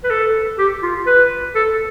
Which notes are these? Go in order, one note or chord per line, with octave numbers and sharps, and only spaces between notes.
B4
A4
G4
F4
B4
A4